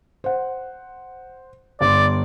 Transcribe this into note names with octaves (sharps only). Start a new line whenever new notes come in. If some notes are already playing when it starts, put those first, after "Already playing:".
C5 F#5
G1 D5 C6